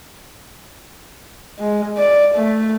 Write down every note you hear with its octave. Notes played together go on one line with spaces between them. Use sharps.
G#3
D5
A3